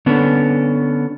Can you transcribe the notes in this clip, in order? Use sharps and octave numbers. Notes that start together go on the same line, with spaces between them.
D3 B3 C#4 D4